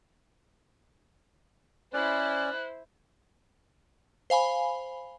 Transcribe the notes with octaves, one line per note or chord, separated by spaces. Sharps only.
C#4 E4 C5 D5 F#6
C5 F5 G#5 B5